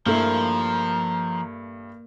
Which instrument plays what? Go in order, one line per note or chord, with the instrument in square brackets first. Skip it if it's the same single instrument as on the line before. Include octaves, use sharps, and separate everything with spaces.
[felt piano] G2 A3 E4 [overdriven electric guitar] F3 [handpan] A#3 [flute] A#5